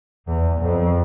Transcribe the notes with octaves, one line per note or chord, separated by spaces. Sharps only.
E2
F2